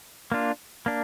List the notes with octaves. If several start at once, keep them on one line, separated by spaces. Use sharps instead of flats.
A#3 D4 F4
A#3 D4